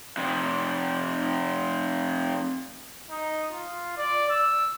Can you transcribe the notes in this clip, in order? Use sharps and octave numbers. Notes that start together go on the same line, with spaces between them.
F2 C3
D#4
F4
D5
E6